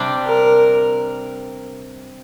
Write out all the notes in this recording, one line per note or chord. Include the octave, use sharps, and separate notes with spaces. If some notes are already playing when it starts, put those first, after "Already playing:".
Already playing: C3 G3 D4
A#4